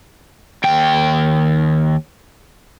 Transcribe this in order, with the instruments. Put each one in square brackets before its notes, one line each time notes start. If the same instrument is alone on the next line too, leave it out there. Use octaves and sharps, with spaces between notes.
[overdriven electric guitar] D#2 G5